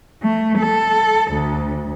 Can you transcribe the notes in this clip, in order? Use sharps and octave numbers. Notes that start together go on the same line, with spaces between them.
A3
A4
D2